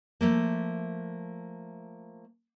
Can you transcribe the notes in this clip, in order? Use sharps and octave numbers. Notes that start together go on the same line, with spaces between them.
F3 A3 A#3